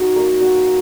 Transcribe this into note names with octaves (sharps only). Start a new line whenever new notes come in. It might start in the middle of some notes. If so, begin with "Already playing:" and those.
Already playing: D#4 F#4
A#3
F#4